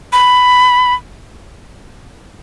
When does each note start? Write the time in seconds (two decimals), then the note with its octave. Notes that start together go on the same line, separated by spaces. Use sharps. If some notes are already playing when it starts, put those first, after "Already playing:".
0.13 B5